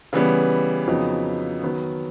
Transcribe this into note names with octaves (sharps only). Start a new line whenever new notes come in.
C#3 E3 G3 B3
F2 C#3 F#3 B3 D#4
D#3 F#3 B3